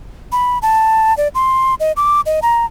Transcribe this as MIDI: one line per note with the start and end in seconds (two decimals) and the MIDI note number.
0.32 0.58 83
0.62 1.15 81
1.17 1.28 74
1.35 1.75 84
1.80 1.92 75
1.97 2.21 86
2.26 2.40 75
2.42 2.65 82